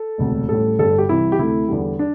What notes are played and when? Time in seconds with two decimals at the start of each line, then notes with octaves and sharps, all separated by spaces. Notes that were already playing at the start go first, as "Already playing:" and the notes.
Already playing: A4
0.18 E1 D2 C3
0.49 A1 A2 G3 A4
0.79 G1 G2 G3 A4
0.98 G4
1.09 C2 C3 E3 G3 E4
1.32 G4
1.38 D2 C3 A3 E4
1.68 E2 D3 G3
1.99 D4